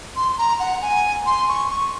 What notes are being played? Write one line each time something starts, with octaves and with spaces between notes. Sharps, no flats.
C6
C6
A#5
F#5
G#5
C6
C#6
C#6